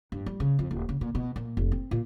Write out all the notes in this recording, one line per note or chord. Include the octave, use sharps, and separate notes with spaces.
G2
G3
C#3
F2
D#1
C#3
A#2
B2
A#2
F1
C4
A#2